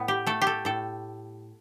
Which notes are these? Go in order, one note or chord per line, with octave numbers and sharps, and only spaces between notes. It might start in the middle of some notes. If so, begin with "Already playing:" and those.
Already playing: A2 B3
G4
A3 A4
G4
A4
A2 A4